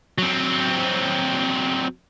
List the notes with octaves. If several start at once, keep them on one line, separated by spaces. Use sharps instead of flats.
F#3 C4